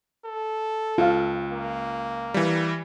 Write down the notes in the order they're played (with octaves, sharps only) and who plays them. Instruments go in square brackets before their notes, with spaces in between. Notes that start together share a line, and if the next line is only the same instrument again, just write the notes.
[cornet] A4
[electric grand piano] C#2 [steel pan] F4 F5
[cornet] A#3
[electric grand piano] E3 G3